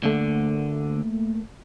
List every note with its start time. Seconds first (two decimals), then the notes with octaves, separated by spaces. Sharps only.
0.03 D2 D3 A3 A#3